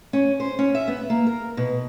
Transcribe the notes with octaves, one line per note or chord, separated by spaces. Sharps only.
C#4
C5
C#4
E5
B3
A#3
A#4
B2